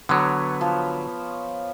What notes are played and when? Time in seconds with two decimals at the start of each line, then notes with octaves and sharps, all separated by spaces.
0.09 D3 F#3 B3 C#5
0.61 F3